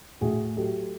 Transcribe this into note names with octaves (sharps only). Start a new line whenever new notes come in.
A2 F#4 G#4
F#3 G4 A4